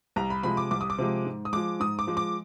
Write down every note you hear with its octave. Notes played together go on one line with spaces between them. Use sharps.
C2 A#5
B5
C3 F3 G#3 B5
D6
C2 D6
D#6
D6
C3 F3 G#3
G#2
D#6
F3 G#3 D6
G#2 D#6
D6
F3 G#3
D6